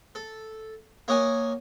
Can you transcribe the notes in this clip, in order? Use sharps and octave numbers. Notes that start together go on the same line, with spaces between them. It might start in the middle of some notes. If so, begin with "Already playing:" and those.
A4
A#3 C#5 D#5 F#5 G#5